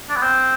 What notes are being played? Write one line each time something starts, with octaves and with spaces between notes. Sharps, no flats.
D4
B3
C4